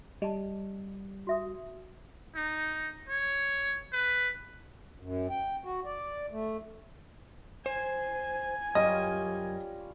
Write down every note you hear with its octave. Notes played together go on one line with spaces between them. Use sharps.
G3 D#5 A5
F#4 E5 D#6
D#4
C#5
B4
F#2
G5
F#4
D5
A3
C5 G#5
F#2 G3 C#4 F4 D#5